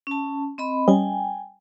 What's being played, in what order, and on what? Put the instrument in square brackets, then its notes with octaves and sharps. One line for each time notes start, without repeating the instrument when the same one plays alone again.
[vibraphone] C#4 A5
C4 D#5 B5
[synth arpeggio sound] G3 C#4 D#5 [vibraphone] G5 G#5